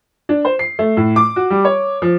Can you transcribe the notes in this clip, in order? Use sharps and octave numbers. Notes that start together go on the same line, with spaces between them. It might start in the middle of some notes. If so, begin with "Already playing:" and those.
D4
C5
C7
A3
A2
D6
F#4
G3
C#5
F3